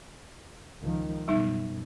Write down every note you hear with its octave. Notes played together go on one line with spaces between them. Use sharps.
C#2 D#3 F3
F#2 B2 G3 D#4 E5